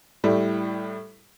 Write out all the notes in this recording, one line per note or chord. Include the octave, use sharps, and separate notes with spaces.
A2 G3 A3 E4